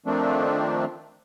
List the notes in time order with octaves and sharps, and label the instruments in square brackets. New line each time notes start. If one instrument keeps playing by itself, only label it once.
[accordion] D#3 F3 A3 C4 D4